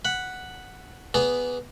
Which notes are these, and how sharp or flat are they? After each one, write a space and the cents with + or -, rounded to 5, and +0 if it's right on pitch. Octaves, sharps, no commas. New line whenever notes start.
F#5 +0 B5 +0
B3 +5 G#4 -5 D5 -30